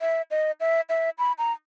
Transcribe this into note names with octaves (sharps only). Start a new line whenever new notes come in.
E5
D#5
E5
E5
B5
A#5